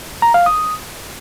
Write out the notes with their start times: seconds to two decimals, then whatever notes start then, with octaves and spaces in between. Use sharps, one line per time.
0.22 A#5
0.34 F5
0.46 D#6